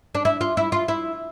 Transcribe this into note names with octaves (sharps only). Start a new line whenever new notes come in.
D4
E4
F4
E4
F4
E4